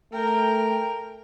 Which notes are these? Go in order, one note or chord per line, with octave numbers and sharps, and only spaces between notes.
A3 A#4 G5